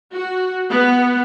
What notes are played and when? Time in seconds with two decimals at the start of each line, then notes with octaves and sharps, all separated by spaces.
0.13 F#4
0.70 B3